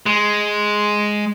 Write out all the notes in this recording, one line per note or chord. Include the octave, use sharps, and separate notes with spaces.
G#3